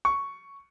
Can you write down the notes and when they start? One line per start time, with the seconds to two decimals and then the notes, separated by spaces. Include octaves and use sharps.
0.05 C#6